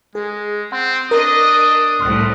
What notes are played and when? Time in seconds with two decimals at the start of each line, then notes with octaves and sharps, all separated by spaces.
0.15 G#3 G#4
0.72 C4 F#5 C6
1.11 D4 A#4 D#5 D#6
2.00 C2 A2 C6 F6 F#6